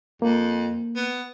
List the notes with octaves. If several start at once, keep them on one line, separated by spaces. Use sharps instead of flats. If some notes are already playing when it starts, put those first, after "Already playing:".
F2 A#3
B3